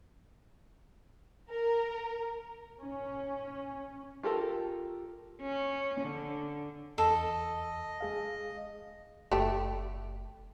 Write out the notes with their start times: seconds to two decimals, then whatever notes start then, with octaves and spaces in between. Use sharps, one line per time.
1.50 A#4
2.81 C#4
4.23 F4 G4 A4 A#4
5.42 C#4
6.01 D3
6.98 E2 A4 D#5
8.00 G#3 G#4 F5
9.32 F#1 A3 G4